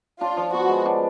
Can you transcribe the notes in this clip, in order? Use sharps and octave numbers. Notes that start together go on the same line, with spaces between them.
D4 F4
F3
B3 F#4
G#3
D4